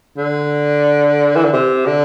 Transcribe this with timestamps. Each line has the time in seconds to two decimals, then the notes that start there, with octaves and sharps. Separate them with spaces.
0.18 D3
1.36 E3
1.44 D3
1.53 C3
1.86 D3